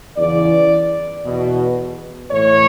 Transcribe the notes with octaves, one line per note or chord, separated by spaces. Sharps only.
E2 C#3 E3 D5
E2 B2
A2 E3 C#5